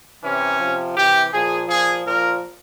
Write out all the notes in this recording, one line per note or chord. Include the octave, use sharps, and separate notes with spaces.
C3 E3 C#4
C3 F3
C3 E3 G4
A#2 F3 G#4
A#2 F3 G#4
A#2 F3 A#4